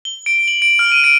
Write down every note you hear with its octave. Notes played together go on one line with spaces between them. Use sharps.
G7
D7
F#7
D7
F6
D#7
D7